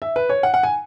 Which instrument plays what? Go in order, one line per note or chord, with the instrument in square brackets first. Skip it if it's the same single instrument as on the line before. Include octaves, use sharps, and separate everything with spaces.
[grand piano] E5
B4
C#5
F#5
F#5
G#5